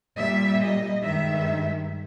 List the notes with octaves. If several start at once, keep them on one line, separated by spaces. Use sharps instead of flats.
A#2 G3 E5
D#5
G2 D#3 G#3 E5